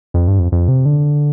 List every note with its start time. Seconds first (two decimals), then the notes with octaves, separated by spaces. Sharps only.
0.14 F2
0.28 G2
0.39 F2
0.52 F2
0.68 C3
0.85 D3